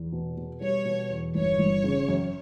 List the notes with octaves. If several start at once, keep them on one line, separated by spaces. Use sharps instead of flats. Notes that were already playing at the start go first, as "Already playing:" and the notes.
Already playing: E2
B2
B2
G3 C#5
B2
E2
G1 C#5
G1
C#3
F#2